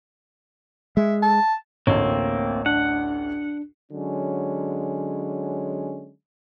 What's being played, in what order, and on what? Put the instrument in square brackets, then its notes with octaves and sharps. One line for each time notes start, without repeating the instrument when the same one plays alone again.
[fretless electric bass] G#3 [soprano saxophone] E5
[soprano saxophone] A5
[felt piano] A1 D2 [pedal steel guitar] A#3 C4 [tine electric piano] C#5
[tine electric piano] D4 [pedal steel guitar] F#5
[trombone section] D3 F#3 G#3 C#4